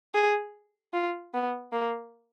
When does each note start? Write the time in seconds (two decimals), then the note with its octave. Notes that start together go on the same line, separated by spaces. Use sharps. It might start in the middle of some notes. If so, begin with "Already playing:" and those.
0.15 G#4
0.94 F4
1.34 B3
1.72 A#3